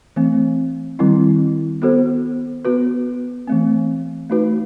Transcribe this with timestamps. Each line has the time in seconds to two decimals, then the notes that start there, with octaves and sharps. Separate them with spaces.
0.16 E3 A3 C4
0.99 D#3 G3 C4 E4
1.82 B3 F#4 A4 C5
2.65 B3 F#4 B4
3.48 E3 A3 C4
4.30 A3 D#4 F#4 B4